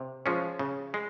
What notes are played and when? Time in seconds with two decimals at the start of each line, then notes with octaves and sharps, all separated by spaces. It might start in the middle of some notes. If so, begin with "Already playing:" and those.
Already playing: C3
0.26 F3 G#3 C#4
0.59 C#3
0.94 G#3